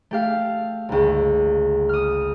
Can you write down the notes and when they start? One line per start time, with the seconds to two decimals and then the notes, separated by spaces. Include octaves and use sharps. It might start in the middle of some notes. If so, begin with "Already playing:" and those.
0.11 A3 G4 F5
0.89 G1 C#2
1.89 D#6 F6